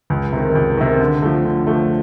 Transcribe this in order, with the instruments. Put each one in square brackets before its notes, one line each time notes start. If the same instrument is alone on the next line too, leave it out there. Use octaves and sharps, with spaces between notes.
[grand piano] C#2
C3 D#3
C#2
C3 D#3
D3
F3 A3
D3
F3 A3